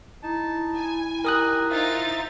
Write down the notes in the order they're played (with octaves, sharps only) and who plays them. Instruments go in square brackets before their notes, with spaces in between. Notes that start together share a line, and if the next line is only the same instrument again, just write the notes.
[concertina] D#4 A5 [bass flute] E4
[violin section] G#5
[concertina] D#4 G4 A#5 [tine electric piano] A#4 D#6 F#6
[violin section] D#4 F4 A6 [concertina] C5 E5